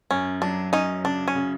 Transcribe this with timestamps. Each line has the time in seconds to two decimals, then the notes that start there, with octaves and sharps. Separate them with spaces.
0.11 F#2 C#4
0.42 F#3 D4
0.72 F#2 C#4 D#4
1.04 C#3 D4
1.28 C#4
1.35 C#3